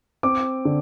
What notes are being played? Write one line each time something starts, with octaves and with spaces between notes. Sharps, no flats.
C4 D6
D3